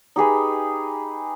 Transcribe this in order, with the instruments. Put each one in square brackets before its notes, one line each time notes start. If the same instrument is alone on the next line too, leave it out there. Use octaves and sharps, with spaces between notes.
[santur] D#4 G4 G#4 B4